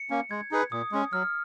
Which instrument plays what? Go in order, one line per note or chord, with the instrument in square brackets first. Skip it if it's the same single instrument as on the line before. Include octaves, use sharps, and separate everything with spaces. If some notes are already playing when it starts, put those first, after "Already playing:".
Already playing: [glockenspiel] C#7
[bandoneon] A#3 C#4
[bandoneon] G#3 [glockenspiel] G#6
[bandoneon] D#4 G#4 B4
[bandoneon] A#2 [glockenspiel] D#6
[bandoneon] G#3 C#4
[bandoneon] F#3 [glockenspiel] F6